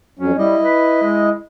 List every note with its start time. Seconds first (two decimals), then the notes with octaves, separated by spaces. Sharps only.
0.19 F2 F#3 C#4
0.38 G3 E4 D#5
0.63 B4
1.03 G#3